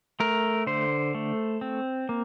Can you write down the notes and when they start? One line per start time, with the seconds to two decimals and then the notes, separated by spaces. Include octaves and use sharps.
0.20 A3 A#4
0.67 D3 C5
1.15 A3
1.61 C4
2.09 A#3